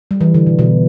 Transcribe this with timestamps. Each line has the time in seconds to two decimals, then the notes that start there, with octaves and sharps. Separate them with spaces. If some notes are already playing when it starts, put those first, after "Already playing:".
0.11 G3
0.21 E3
0.34 D3
0.47 B2
0.59 B2